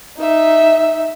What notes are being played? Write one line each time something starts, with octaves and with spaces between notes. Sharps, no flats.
D#4 E5